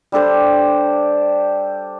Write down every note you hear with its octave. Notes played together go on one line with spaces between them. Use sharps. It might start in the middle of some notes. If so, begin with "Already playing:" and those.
G3 D4 A4 C5